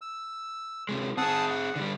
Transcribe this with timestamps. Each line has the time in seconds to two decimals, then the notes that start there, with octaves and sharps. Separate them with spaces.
0.02 E6
0.89 C3 G#3
1.17 C4 G#4 F#5 A5 D#6
1.50 F#5
1.76 D3 G3